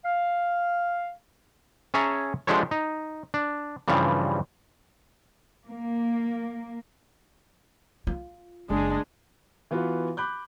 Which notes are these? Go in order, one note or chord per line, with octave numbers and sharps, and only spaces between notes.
F5
C#4 G#4 C#5 E5 A5 A#5
F3 G#3 D4 G4 A4 C#5
D#4
D4
G2 C#3 E3 F3 G3
A#3
F4
F#1 G#3 D4
E3 B3 F4 F#4 B4
B5 D6 F#6 G6